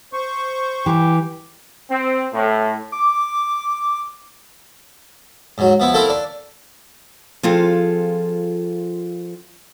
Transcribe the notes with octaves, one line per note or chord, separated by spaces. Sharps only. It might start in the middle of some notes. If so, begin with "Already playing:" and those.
C5 C#6
E3 G4
C4
A2
D6
G#2 F#3
F3 B3 E4
A3 C4 E4 A4 A#4 F5
D4
F3 C4 F4 G#4 A4